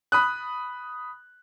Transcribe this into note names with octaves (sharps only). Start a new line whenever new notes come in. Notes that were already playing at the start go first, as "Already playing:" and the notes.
B5 D#6 F#6